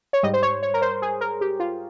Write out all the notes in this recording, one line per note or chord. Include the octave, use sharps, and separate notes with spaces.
C#5
G#2 G3 D#5
C5
C#5
C#5
A#4
C5
G#4
A#4
G4
F4